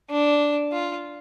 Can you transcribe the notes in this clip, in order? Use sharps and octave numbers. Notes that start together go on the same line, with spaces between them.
D4
F4